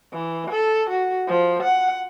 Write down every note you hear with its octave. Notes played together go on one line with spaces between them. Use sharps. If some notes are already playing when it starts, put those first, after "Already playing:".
E3
A4
F#4
F3
F#5